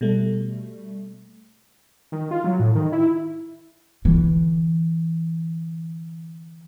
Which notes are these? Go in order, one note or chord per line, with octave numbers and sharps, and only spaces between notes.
B2 G3 A3
D#3
F4
F#3
A2
D#3
E4
D3 E3